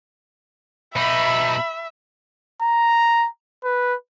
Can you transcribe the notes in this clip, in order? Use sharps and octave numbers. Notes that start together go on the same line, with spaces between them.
B2 D#4 E5 B5
A#5
B4